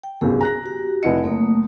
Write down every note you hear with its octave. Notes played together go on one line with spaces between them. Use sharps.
G5
G1 C2 F#2 G#4
A#5 F#6 A#6
F#4 G4
F1 E4 D#5 F#5 C#7
F#1 A3 A#3 D#6